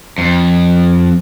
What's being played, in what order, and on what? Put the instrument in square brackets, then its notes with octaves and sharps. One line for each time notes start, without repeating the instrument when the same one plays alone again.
[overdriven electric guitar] F2